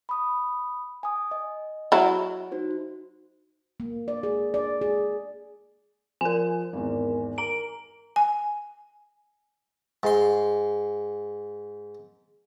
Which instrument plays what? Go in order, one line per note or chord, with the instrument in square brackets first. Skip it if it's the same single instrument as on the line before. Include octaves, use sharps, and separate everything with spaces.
[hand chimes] B5 D#6
G#5 D#6
D#5
[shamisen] F#3 E4
[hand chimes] D#4 F#4 C5
[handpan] A#3
D5
G#4
D5
G#4
[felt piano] F3 [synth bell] A#4 G#5
[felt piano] G#1 E2
[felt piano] A#4 [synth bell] A#5 D7
[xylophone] G#5
[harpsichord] G#2 C6